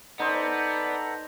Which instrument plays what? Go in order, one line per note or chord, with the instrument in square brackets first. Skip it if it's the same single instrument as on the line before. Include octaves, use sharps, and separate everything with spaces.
[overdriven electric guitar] B3 [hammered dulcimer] D#4 C5 [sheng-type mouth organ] A4 F#5 A#5 [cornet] D5